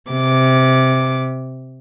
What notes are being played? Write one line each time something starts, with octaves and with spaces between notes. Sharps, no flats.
C3 D6